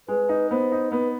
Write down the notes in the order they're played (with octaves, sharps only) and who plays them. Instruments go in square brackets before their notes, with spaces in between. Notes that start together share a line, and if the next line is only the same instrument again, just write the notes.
[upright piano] G#3 [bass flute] B4
[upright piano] D#4
[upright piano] B3 [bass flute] C5
[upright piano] D#4
[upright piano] B3 [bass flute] B4